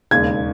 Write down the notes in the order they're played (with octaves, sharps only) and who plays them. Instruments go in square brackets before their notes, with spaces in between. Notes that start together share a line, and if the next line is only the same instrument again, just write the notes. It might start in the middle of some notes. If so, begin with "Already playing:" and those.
[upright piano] E1 D#2 C#3 G#6